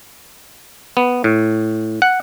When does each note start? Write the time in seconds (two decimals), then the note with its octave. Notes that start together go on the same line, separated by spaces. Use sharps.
0.97 B3
1.24 A2
2.02 F#5